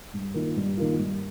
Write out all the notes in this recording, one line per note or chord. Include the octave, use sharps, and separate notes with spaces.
G2
D#3 A#3 F4
G2
D#3 A#3 F4
G2